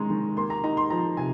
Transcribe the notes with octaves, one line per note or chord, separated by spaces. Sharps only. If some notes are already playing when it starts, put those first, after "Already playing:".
Already playing: D#3 G#3 C#4 G#5 A#5 C6
D#3
A#3 C6
A#5
D#4 A#5
C6
F3 A#5
C3 G#5